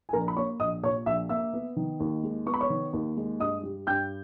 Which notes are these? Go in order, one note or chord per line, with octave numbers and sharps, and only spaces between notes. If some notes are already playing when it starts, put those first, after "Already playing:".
G#5
A#1 A#4 A#5
B5
A#3 C#5 C#6
A#1 D#5 D#6
A#2 C#5 C#6
A#1 E5 E6
A#3 E5 E6
B3
D#3
D#2
G#3
B3 C#6
B5
C#5 C#6
D#3
D#2
G#3
G2 D#5 D#6
G3
G2 G5 G6